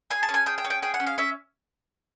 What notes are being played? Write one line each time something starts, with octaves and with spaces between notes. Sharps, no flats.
G#4 G#5
A5
C#4
G#5
G#4 G5
G5
C#4
G5
G#4 G5
F#5
C#4
F5
C#4 E5